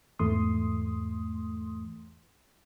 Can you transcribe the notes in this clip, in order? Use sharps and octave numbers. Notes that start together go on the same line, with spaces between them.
E2 G#2 E3 A3 C6 D#6